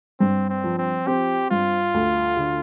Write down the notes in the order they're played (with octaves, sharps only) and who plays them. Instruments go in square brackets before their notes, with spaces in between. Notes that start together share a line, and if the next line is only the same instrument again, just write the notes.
[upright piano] G2 [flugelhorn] C4
[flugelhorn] C4
[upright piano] F3
[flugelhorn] C4
[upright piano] C4 [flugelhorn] G4
[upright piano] G2 [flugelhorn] F4
[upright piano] D2
D3